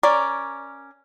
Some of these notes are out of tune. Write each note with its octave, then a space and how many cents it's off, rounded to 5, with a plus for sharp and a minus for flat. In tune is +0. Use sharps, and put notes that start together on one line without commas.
C#4 +0 A#4 +0 D5 +0